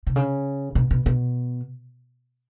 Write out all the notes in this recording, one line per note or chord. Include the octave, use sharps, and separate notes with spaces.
C3
C#3
B2
B2
B2